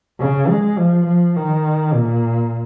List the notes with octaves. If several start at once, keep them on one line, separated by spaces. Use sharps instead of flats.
C#3
G#3
F3
F3
D#3
A#2